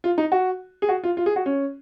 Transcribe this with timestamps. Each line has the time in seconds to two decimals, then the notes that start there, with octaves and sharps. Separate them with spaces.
0.04 F4
0.18 D#4
0.32 F#4
0.82 G#4
0.89 F#4
1.04 F4
1.17 F4
1.26 G#4
1.36 F#4
1.46 C#4